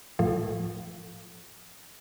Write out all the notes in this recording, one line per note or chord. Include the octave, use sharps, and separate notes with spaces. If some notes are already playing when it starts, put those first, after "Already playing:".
A2 F3